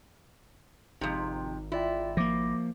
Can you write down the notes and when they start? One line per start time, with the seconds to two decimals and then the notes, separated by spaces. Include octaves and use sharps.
1.01 G#1 F2 C3 D#4
1.72 E4 F4 D5 G5
2.17 F3 A#3 D6 A#6